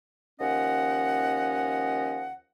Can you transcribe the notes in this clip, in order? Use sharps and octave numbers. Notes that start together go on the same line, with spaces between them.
D#2 F3 C#4 D#5 F#5